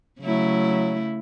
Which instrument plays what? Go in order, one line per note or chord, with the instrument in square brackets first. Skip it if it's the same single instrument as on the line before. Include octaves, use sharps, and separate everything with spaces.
[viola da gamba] C#3 A3 E4 [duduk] F#3